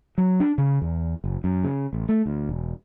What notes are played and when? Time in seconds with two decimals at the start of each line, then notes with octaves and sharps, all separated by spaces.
0.18 F#3
0.40 D4
0.58 C#3
0.82 E2
1.24 F#1
1.44 F#2
1.64 C#3
1.93 A1
2.09 A3
2.26 D2
2.49 E1